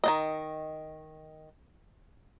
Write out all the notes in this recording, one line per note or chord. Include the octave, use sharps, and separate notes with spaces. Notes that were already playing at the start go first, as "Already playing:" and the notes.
D#3 C4 D#5